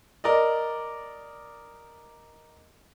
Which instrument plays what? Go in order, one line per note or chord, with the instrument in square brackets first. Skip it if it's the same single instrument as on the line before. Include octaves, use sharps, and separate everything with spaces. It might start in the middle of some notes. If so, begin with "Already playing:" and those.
[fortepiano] A#4 D5 D#5